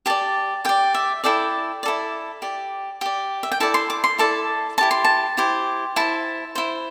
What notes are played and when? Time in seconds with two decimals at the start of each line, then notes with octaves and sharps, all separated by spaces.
0.06 G4 D5 A5
0.65 G4 D5 G5
0.95 E5
1.24 E4 A4 D5 G5
1.83 E4 A4 D5
2.42 G4 D5
3.01 G4 D5
3.43 E5
3.52 G5
3.60 E4 A4 D5 A5
3.74 C6
3.90 D6
4.04 C6
4.18 E4 A4 D5 A5
4.78 E4 G4 C5 A5
4.91 C6
5.04 A5
5.37 E4 G4 C5
5.96 E4 C5 A5
6.55 E4 C5